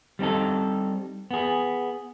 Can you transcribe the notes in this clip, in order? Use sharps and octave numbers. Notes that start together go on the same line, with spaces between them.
G3 C4 D#4 A4
B3 G#4